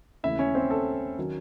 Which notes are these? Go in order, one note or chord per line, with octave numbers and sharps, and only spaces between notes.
D#2 C#3 E3 A3 E4 E5
C#4 C#5
C4 C5
A4
D#3 F#3 C#4